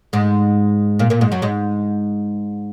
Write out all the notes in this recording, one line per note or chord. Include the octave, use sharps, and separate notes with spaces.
G#2 G#3
A#2 A#3
A#2 A#3
G#2 G#3
F#2 F#3
G#2 G#3